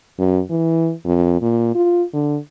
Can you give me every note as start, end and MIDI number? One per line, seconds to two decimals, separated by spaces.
0.18 0.41 42
0.50 0.92 52
1.05 1.36 41
1.41 1.72 46
1.75 2.03 65
2.13 2.37 50